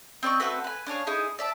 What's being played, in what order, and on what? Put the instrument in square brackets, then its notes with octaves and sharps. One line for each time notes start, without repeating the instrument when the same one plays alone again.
[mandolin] C4 D5 D#5 C#6
A3 C4 F#4 B4
B4 G#5
D4 G#4 C#5 F5
D#4 E4 G#4
D5 E5 A5